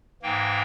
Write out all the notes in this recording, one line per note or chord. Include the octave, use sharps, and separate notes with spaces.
G#2 E3 A#3 G5